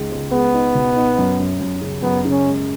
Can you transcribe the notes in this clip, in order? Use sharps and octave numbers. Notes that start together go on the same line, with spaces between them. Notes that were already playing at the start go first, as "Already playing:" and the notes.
Already playing: C#2 G#3 D#4
C#2
G#3 B3
D#4
B2
D#4
F#2
F#2
F#2
C#3
F#2 B3
C#3
C#4
G#3